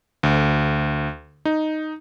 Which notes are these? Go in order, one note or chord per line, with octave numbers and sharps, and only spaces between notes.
D2
D#4